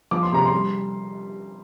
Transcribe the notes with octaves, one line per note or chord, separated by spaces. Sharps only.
F3 D6
C6
C3 A#5
C6
G3